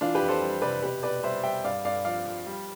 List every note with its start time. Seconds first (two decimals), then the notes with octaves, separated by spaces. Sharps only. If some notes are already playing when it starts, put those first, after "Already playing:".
0.01 E3 D4 F4
0.15 G4 B4
0.22 F2
0.28 A4 C5
0.41 G3
0.62 C3 B4 D5
0.82 B2 G4 B4
1.03 B2 B4 D5
1.23 G3 C5 E5
1.43 G3 E5 G5
1.64 G2 D5 F5
1.85 G2 D5 F5
2.05 F3 D5 F5
2.26 F3
2.47 G3